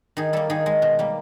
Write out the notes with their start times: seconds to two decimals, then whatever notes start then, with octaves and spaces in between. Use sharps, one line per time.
0.17 D#3 G#4
0.33 G3 A#3 A4
0.50 D#3 G#4
0.66 G#3
0.82 B2
0.99 G3 A#3